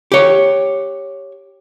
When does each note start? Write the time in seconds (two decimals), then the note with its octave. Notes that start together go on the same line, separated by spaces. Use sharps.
0.12 G4 C#5